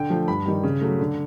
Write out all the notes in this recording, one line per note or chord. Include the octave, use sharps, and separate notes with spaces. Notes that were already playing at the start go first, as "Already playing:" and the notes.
Already playing: D3 G5
F3 A3
G2 B5
D#3 G3
C#3
F#3 A3
D3